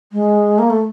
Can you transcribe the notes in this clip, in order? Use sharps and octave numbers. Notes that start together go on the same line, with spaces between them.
G#3
A#3
A3